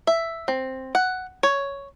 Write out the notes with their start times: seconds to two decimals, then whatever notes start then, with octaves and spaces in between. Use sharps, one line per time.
0.07 E5
0.48 C4
0.95 F#5
1.43 C#5